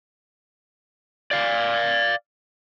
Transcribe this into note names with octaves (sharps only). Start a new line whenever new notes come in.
D5 F5